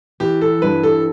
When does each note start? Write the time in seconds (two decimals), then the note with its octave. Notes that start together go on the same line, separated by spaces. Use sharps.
0.20 E3 G4
0.41 A4
0.62 G2 B4
0.83 A4